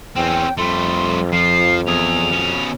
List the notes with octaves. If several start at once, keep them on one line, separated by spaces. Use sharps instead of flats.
E2 C4 C#4 G5
F2 G3 A3 C6
F3 C7
E2 G#4 F7
B2 C#4